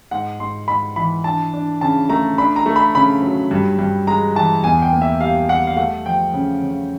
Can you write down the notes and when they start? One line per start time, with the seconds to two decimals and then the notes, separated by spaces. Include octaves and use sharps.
0.11 G#2 F#5
0.40 G#2 C6
0.68 G#2 B5
0.96 E3 B5
1.24 D4 A5
1.53 D4
1.81 C#3 A5
2.09 A3 A#5
2.38 D4 B5
2.56 A#5
2.66 A3
2.76 B5
2.95 C#3 B5
3.22 F#3
3.51 G2
3.79 G2
4.07 G#3 A#5
4.35 E3 A5
4.64 E2 G#5
4.82 G5
4.93 A#3
5.02 E5
5.20 G3 F5
5.49 G3 F#5
5.67 F5
5.76 A3 F#5
6.06 F3 G5
6.34 C#3
6.62 C#3